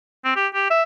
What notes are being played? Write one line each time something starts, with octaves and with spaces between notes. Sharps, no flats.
C4
G4
G4
E5